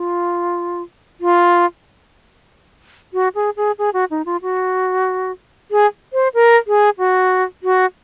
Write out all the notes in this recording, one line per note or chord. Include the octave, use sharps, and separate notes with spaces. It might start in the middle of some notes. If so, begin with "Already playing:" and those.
Already playing: F4
F4
F#4
G#4
G#4
G#4
F#4
D#4
F4
F#4
G#4
C5
A#4
G#4
F#4
F#4